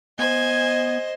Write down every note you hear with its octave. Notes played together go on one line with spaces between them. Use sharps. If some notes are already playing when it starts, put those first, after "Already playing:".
B3 C5 D#5 G#5